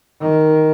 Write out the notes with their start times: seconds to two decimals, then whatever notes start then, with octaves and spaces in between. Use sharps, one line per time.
0.22 D#3